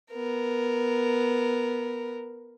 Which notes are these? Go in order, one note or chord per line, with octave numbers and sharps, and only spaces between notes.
B3 A#4